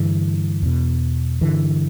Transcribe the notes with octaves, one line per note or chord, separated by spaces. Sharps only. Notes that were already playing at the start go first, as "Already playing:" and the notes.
Already playing: G2 D3 E3
E2 B2
G2 D3 E3